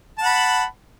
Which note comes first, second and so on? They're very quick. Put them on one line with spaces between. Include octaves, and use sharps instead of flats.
A5 F#5 B5